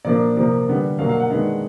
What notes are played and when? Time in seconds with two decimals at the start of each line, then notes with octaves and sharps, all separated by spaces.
0.05 A#2 F3 A#3 D4 D5
0.36 C3 F3 A#3
0.67 D3 G3 B3 D4
0.99 B2 F#3 A#3 D4 F5
1.09 F5
1.20 F#5
1.30 D#3 G#3 B3 D4